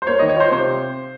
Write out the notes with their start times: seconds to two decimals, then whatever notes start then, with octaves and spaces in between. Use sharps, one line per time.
0.02 C5
0.07 A#3 C#5
0.19 D#3 D#5
0.29 C#5
0.37 F4 C5
0.52 C3 C5